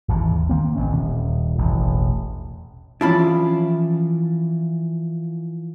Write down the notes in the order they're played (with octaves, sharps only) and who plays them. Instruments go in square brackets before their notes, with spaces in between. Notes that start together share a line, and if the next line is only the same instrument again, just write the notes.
[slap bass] G#1 D#2 C3 E3
D#3 A#3 C4
A1 C3 C#4
D#1
E1 A1
[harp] E3 F3 [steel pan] C#4 A5 [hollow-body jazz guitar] E4 F4 B5